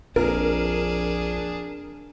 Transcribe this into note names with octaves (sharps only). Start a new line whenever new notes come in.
A#1 F2 D4 G#4 A#4